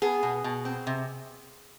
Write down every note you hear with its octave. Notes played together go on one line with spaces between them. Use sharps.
B3 G#4
B2
B2
C4
C3